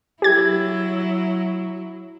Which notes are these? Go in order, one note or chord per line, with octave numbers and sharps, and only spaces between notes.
F#3 E4 G4 G#6